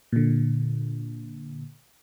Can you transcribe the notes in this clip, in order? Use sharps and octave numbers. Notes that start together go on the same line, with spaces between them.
A#2 D3